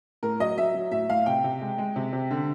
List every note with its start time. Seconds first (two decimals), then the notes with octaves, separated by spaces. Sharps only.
0.23 A2 A#4
0.40 F#3 D#5
0.57 F#3 E5
0.75 F#3
0.91 A2 E5
1.09 A2 F5
1.26 C3 G5
1.44 C3
1.61 G#3
1.78 G#3
1.96 C3
2.13 C3
2.31 D3